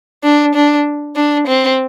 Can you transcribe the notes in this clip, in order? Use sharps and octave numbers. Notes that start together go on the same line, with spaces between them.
D4
D4
D4
C4